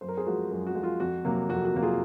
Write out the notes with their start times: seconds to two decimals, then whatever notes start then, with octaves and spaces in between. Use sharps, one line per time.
0.01 F#2 C5
0.08 A#4
0.17 G#4 C5
0.26 F3 G#3 F#4 A#4
0.51 F#2
0.67 F#4
0.75 F3 G#3
0.83 F4
1.00 F2 F#4
1.25 C3 F#3 A#3
1.49 F2 F#4
1.65 F#4
1.74 C3 F#3 A#3
1.82 F4 G#4